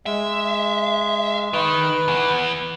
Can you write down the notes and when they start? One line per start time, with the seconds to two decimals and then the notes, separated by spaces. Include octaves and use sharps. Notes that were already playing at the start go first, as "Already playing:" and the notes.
0.06 G#3 E5
1.53 D#3 B4
2.08 E3 B3